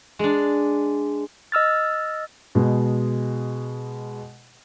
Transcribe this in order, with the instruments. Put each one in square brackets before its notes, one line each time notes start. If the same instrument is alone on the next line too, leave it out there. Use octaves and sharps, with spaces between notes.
[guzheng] G#3 D4
[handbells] D#5 E6 F6 A6
[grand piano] B2 G#3